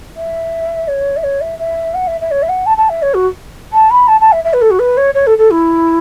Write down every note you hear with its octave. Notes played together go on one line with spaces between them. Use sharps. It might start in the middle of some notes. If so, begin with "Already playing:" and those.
E5
C#5
E5
C#5
E5
E5
F#5
E5
E5
C#5
E5
F#5
A5
A5
E5
C#5
F#4
A5
B5
A5
A5
E5
E5
B4
A4
F#4
B4
C#5
C#5
A4
A4
E4